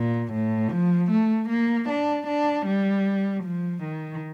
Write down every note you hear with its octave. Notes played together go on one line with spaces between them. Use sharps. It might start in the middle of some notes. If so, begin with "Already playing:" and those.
Already playing: A#2
A2
F3
A3
A#3
D4
D4
G3
F3
D#3